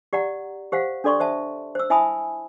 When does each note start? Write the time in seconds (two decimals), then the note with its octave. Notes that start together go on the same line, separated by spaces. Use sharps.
0.13 G4 D5 F#5 A#5
0.72 G4 C5 F5 F#5
1.04 D4 A4 D5 C6 C#6
1.20 C5 E5 A5
1.75 C5 E6
1.90 E4 E5 G#5 A5 B5 D#6